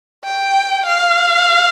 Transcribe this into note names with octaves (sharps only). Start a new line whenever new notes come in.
G5
F5